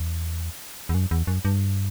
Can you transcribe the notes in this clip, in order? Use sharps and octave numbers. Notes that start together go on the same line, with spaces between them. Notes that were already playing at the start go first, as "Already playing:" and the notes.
Already playing: E2
E2
F#2
E2
F#2
G2